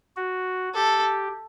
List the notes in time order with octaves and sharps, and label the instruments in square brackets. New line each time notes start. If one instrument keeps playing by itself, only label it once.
[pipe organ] F#4
[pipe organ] G4 [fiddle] A4